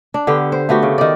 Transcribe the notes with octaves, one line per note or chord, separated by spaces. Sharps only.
D4
D3 B3 G4
C5
A3 B3 F#4 G4
C#3
D#3 D5